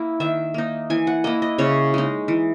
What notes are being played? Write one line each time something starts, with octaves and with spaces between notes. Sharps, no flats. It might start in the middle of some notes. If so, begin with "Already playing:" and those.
Already playing: A#3 E4
D#3 E5
A#3 D#4
E3 G#5
F#5
A#3 E4 D#5
D#5
C#3 C#5
G#3 D#4
E3